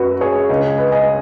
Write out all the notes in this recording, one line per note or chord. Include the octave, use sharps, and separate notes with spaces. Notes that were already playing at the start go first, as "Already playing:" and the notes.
Already playing: F#2 F#3 F#4 B4
G#4 C#5
C#2 C#3 G#3 C#4
B4 D#5
D#5 G#5